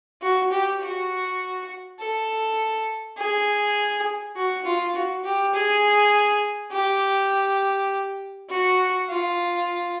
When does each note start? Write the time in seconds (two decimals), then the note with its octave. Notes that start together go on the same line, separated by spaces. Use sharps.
0.22 F#4
0.51 G4
0.81 F#4
1.99 A4
3.18 G#4
4.36 F#4
4.65 F4
4.95 F#4
5.24 G4
5.54 G#4
6.72 G4
8.49 F#4
9.09 F4